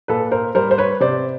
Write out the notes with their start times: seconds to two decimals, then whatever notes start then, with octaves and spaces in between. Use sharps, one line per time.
0.08 A#2 A4 B4
0.31 A#4 C5
0.55 G3 A#4 C5
0.71 C5
0.78 B4 C#5
1.00 C3 C5 D5